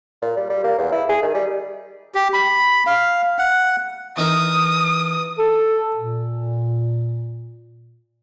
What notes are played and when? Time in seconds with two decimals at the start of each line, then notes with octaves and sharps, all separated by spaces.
0.22 A#2
0.37 G3
0.50 G3
0.64 A#3
0.78 E2
0.92 E4
1.09 G#4
1.22 D#3
1.35 G3
2.15 G4
2.33 B5
2.87 F5
3.38 F#5
4.17 E3 D#4 A#4 D#6
5.39 A4
5.96 A#2